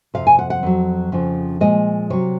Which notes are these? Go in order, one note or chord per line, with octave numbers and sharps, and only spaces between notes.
F2 C3 F3 F5
G#5
F#5
F#5
F2 D#3 F#3
F2 C#3 F3
A#2 F3 G#3 D#5
C3 F#3 C#5